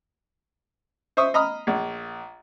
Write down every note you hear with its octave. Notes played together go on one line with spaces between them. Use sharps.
C5 E5 C#6 D#6
D#5 A#5 B5 D#6 F6
A#1